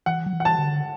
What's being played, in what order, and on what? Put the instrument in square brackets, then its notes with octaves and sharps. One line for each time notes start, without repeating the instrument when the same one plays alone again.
[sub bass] E3 [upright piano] F#5
[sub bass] F#3
E3
[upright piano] F#5
A5
[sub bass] D3